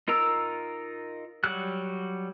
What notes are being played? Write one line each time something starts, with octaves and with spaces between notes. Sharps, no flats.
D#4 F4 A#4 A#5 E6
F#3 G3 F#4 F#6